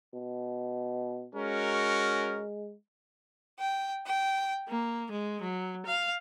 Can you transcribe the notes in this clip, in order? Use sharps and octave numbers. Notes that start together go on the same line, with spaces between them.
B2
G#3 C#4 F#4 A#4
G5
G5
A#3
G#3
F#3
F5